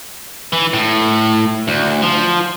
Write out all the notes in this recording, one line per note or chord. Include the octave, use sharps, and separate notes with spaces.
E3
A2
D2
F3